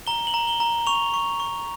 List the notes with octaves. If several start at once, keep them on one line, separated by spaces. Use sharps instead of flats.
A#5 G7
F#7
A#5
G7
A#5
C#6 F7
C#6
C#6